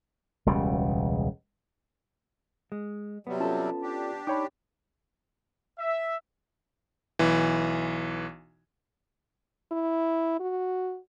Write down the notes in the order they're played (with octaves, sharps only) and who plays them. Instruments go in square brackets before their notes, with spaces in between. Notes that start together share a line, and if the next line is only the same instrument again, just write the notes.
[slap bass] E1 C#2 C#3 G3
[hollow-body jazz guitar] G#3
[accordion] C3 F#3 G3 [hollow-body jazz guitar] B3
[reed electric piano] C#4 A4 [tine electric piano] F4 A5
[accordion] D4 G4
[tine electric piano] D#4 B5 [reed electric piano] C#5 G5 D6
[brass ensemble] E5
[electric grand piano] B1 E3
[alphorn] E4
F#4